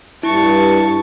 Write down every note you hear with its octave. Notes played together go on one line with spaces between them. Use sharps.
G2 E4 A5 C#6